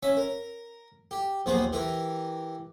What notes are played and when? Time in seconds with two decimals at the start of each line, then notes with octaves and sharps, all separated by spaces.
0.03 C#4 E5
0.17 A#4
1.11 G4
1.46 A#1 D#2 B3 G#4 C5
1.73 E3 G4 A#4